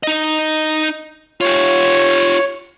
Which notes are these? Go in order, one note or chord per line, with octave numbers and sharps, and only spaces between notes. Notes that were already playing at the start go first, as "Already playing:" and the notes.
D#4 D#5
F4 G4 C#5